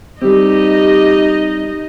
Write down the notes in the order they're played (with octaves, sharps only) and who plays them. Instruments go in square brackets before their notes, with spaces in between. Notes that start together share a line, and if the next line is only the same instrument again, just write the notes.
[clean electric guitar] G3 C4 [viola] D#4 D#5 [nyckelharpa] G4